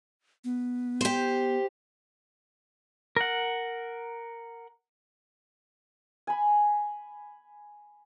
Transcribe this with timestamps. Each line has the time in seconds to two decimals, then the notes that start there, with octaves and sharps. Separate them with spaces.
0.44 B3
1.01 G4 C5
3.17 A#4 F#5
6.27 G#5 B5